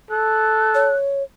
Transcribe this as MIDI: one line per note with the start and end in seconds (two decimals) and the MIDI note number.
0.10 0.93 69
0.10 0.96 90
0.75 1.23 73